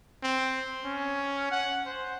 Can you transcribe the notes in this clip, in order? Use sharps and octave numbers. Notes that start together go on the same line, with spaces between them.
C4
C#4
F#5
C5